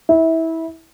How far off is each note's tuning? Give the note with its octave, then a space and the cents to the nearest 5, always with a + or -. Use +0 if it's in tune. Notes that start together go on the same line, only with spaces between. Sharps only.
E4 -25